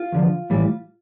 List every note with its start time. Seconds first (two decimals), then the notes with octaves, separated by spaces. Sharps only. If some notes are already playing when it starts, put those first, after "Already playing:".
Already playing: F4
0.12 E2 D3 F3
0.50 A2 E3 G3